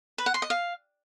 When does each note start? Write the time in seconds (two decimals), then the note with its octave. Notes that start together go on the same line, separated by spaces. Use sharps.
0.18 B4
0.26 F#5
0.34 C6
0.42 D#5
0.50 F5